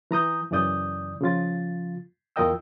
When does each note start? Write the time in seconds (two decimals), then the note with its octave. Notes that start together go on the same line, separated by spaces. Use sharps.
0.11 E3 A#5 D#6 G6
0.51 F#2 C#3 E3 D5 D#6 G6
1.21 C#3 F3 F4 A6
2.36 E2 F4 A#4 D#5 G5 E6